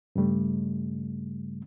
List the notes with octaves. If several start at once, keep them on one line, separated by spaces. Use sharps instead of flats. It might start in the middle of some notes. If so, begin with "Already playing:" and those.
G2 C#3 G3 A3